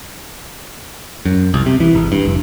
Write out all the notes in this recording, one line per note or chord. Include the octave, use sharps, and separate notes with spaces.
F#2
C2
C3
E3
G#1
G2
F1